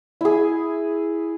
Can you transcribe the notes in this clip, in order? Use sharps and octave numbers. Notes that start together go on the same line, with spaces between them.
E4 G#4